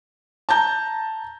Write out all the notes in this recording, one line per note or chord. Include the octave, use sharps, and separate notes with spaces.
A5 A#5 G6